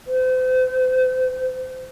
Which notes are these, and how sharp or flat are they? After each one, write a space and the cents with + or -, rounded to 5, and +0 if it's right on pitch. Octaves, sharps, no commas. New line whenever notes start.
C5 -35